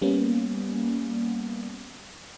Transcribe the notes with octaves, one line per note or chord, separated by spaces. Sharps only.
G3 A#3 B3 C#4